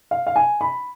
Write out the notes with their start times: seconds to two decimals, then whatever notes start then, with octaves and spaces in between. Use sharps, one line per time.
0.11 F5
0.27 F5
0.36 G#5
0.61 B5